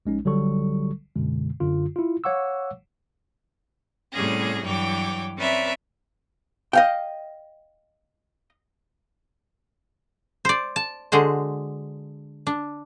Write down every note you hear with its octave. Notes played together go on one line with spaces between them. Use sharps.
A#1 G#3 C#4 D#4
A1 D3 F#3 G3 A4 C#6
F#2 B2 D3 G#3
F#2 D3 F4
E4 F4
C#5 F5 F#5 C#6 D6 E6
A2 C3 G3 C#4 G#4 A#6
G2 E3 F#3 C#5 G5 D6
C4 C#4 B4 D5 E5 A#5
D#5 F5 G5
C5 D5
A5
D3 G#3 F#4 C5
D4